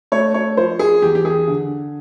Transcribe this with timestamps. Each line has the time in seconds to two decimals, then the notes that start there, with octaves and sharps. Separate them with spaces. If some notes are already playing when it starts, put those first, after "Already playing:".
0.12 A3 C#5
0.34 C#5
0.57 F3 C5
0.79 G#4
1.02 E2 G4
1.15 G4
1.25 G#4
1.48 D3